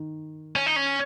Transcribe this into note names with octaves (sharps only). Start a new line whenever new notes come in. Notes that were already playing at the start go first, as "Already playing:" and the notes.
Already playing: D#3
C#4
D#4
C#4